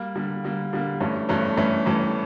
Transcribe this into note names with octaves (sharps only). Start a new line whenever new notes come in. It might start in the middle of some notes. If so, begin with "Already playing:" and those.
Already playing: G3 A#3
D3 G3 A#3
D3 G3 A#3
D3 G3 A#3
G2 E3 A3 C#4
G2 E3 A3 C#4
G2 E3 A3 C#4
G2 E3 A3 C#4